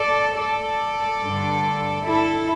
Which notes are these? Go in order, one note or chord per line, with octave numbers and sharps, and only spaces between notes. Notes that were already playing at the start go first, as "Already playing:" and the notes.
Already playing: A4 D5
A4 D5
G2 D3
E4 A4